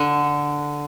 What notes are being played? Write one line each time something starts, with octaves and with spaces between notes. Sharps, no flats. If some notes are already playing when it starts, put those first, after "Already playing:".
Already playing: D3